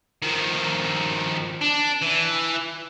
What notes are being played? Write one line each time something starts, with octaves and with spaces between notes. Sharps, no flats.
D#3 F3
D4
E3